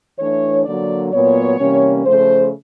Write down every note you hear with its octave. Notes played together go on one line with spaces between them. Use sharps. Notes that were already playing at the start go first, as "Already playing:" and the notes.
E3 A3 D4 C#5
D3 F#3 A#3 D5
A#2 F#3 B3 C#5
C3 E3 G3 A#3 C#4
C#3 F3 A3 C5